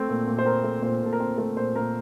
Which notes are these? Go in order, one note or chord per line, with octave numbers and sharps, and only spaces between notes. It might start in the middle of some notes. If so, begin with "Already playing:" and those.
Already playing: A3 C4 A4
A#2
A#2
C5
C4 A#4
A3
A#2 C5
A#2 A4
A#4
C4 C5
A3 A#4
A#2 C5
A#2 A#4